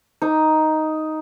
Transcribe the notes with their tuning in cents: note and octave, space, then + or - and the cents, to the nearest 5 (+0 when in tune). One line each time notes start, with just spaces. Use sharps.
D#4 +5